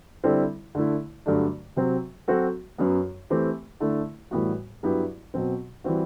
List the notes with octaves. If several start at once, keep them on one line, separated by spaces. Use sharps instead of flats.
D3 G3 C4 E4 A4
D3 A3 E4
G2 D3 F#3 A3 D4
C3 F#3 C4
F#3 C4 F#4 A4
F#2 F#3 B3
E3 A3 C4 G4
D3 A3 E4
A2 E3 G3 B3 F#4
G2 F#3 B3 E4 G4
B2 F#3 C4
E3 G3 C4 F#4